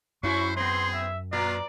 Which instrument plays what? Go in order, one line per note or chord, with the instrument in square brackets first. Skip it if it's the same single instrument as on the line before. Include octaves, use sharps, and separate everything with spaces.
[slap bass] F#2 [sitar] C#4 E4 F#4 [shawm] C5 [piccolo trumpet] C#6
[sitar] B3 C4 [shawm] G#4 [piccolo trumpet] C6
[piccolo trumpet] E5
[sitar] A#2 [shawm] F4 [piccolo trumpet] D5